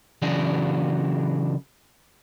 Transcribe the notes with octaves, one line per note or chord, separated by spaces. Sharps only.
C#3 E3 F#3 D4 F#4 G#4